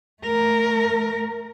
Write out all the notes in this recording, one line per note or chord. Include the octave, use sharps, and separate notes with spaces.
A3 A#4